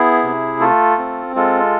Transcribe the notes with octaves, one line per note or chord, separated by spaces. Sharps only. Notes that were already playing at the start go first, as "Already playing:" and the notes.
Already playing: B3 E4 G#4
C3
A3 F4 A4
C4
G#3 F4 A4